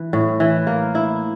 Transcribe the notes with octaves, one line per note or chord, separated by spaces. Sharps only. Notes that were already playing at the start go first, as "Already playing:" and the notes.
Already playing: E3
A2
E3
A#3
E4